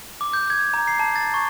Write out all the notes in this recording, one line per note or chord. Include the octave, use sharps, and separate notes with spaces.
D6
G6
G#6
A#5
C7
A5
A6
C#6